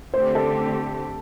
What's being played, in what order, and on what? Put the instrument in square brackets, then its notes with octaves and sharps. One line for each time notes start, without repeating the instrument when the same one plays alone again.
[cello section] D3 A3 C4 G4 [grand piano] C5
[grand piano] A4